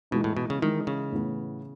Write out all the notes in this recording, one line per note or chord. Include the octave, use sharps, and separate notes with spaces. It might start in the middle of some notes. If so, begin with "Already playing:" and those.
B2 E3 G#3 D#4
A2
B2
C#3
D#3 E3 G#3 D#4
C#3
A2 E3 B3